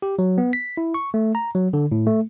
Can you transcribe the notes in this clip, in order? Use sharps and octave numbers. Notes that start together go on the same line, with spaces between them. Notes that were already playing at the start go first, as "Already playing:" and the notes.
G4
F#3
B3
B6
E4
C#6
A3
A#5
F#3
D3
A2
A3